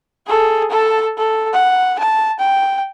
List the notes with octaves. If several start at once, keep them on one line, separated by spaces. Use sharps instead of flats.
G#4 A4
A4 A5
A4
F#5
A5
G5